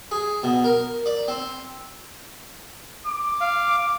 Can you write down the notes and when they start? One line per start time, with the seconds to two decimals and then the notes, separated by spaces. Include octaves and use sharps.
0.11 G#4
0.43 B2
0.64 A#4
1.06 D5
1.28 C4
3.07 D6
3.41 F5